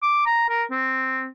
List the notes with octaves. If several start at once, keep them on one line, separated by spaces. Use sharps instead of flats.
D6
A#5
A#4
C4